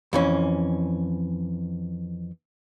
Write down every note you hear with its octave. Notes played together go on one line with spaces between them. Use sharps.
F2 E3 C#4